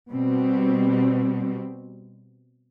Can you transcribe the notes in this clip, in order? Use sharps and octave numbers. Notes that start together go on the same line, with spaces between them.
B2 G3 C4